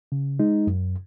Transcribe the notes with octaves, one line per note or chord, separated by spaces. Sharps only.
C#3
G#3 D#4
F#2